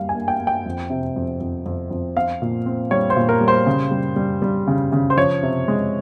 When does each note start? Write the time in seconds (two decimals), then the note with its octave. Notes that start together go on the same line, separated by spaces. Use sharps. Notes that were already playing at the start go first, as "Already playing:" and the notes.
Already playing: G3 A#3 F5
0.09 G#5
0.15 A#3
0.28 G5
0.40 A#3
0.47 G5
0.66 F2
0.90 C3
1.16 F2
1.41 F2
1.66 F2
1.91 F2
2.17 C4 F5
2.42 A#2
2.66 C4
2.91 G3 C#5
3.10 C5
3.17 A#2
3.29 A#4
3.41 G3
3.48 C5
3.66 C#3
3.91 G3
4.16 G3
4.42 G3
4.67 C#3
4.92 C#3
5.10 C5
5.17 F3 C#5
5.43 C3
5.68 G#3